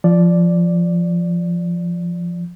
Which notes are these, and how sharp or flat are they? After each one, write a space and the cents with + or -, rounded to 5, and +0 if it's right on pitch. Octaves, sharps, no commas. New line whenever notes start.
F3 -10 D5 +0